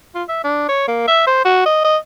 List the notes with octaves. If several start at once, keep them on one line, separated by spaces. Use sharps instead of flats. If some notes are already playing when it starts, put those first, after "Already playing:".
F4
E5
D4
C#5
A#3
E5
C5
F#4
D#5
D#5